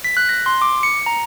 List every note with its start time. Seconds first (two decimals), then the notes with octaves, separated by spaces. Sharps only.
0.04 B6
0.17 F#6
0.29 A#6
0.46 C6
0.62 D6
0.83 C#7
1.06 A#5